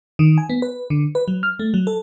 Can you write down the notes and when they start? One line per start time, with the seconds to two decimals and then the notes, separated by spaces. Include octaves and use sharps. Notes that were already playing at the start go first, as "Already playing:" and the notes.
0.19 D#3
0.38 G#5
0.49 B3
0.62 B4
0.90 D3
1.15 B4
1.28 F#3
1.43 F6
1.59 A3
1.74 F#3
1.87 A4